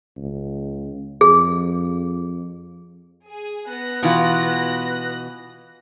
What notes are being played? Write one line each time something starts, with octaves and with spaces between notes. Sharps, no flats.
C#2
F2 G#4
G#4
B3 F#6 A#6
B2 E3 F4